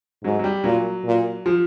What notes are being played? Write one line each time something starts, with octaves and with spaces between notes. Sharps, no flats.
G#2 F#3
F#3
G3
A#2 F#3
A#2
F3